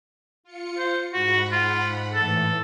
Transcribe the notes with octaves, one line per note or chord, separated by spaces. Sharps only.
F4 C#7
C5
G#2 F#4 F#5 B5
F4
A2 E3 A4